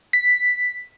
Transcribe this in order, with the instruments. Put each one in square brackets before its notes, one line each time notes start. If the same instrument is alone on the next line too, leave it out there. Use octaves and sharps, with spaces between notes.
[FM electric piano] B6